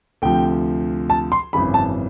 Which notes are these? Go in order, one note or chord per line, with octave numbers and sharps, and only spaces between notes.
D2 C3 F3 G5
A5
C6
G#1 F#2 C#3 E3 B5
A5